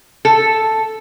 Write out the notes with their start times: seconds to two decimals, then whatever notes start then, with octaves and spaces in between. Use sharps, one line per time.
0.25 A4